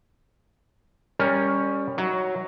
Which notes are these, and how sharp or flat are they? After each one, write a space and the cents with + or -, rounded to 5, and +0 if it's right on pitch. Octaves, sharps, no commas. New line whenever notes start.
G3 +20 C#4 +0 A#4 +0
F#3 +5 D#4 +30